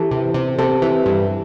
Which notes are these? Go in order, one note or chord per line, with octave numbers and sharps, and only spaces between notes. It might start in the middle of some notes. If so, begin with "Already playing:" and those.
Already playing: E3 G4 A4
C3
C3
C3 A4
E3
G2